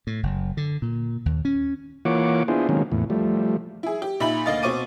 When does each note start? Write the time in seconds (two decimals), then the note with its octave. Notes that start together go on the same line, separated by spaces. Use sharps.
0.07 A2
0.23 F#1
0.57 D3
0.82 A#2
1.26 D#2
1.45 C#4
2.05 E3 A#3 F4 C#5 F#5 D6
2.48 B3 D4 E4 F4 G#4 C5
2.69 D#3 F#3 G#3 A#3 C4 C#4
2.92 E2 A2
3.10 F3 G3 A3
3.83 E4 G#4
4.02 G4
4.20 A#2 D#4 E5 B5 F#7
4.46 D2 A#3 D#5 F5 A6
4.63 B2 C4 C#6 D6 D#7